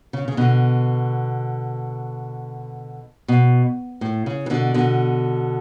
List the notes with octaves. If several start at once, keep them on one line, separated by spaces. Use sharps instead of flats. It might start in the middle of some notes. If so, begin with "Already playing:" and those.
C#3
C#3
B2 D3
B2
A2
C#3
E3
B2 D3
B2 D3